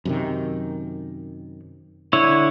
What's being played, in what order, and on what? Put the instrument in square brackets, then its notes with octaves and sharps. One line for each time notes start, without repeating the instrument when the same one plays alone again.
[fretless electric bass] F#2 C3 D#3
[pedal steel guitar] D3 E4 C#5